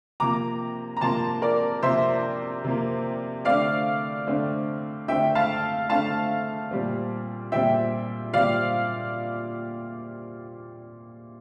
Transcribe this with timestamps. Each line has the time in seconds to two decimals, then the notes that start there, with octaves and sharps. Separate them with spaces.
0.20 C3 F3 A#3 A#5 D6
0.97 A#5
1.01 C3 F3 A#3 A5 C6
1.42 A#4 D5
1.82 C3 F3 A#3 C5 E5
2.64 C3 F3 A#3
3.45 D3 A3 C4 D5 F5
4.27 D3 A3 C4
5.08 D3 A3 C4 E5 G5
5.35 F5 A5
5.89 D3 A3 C4 F5 A5
6.71 A#2 G3 C4
7.52 A#2 G3 C4 E5 G5
8.33 A#2 G3 C4 D5 F5